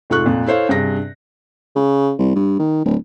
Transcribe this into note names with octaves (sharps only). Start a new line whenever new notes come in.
F1 G#2 F4 A4 C#6 F#6
F2 A#2
E4 A4 C5 C#5 F5
G2 C3 G#4 A#6
C#3
C2
G2
D#3
D1